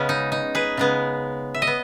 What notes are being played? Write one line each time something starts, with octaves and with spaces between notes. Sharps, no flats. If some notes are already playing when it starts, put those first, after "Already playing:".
Already playing: C#3 G#3 B3 C#4
D#4
D#4
G#4 B4
C#3 G#3 B3
E5
D#5
B3